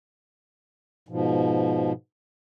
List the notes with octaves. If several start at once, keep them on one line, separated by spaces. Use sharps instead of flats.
G#2 B2 F3